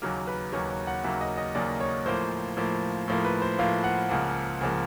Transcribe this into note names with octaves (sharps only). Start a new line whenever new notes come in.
D#2 C#3 F#3 A#3 A#4
B4
D#2 C#3 F#3 A#3 C#5
C#5
F#5
D#2 C#3 F#3 A#3 E5
D#5
D#5
D#2 C#3 F#3 A#3 D5
C#5
A2 F3 A#3 C5
A2 F3 A#3
A2 F3 A#3
B4
C5
A2 F3 A#3 F5
F#5
C#2 C#3 F3 A#3
C#2 C#3 F3 A#3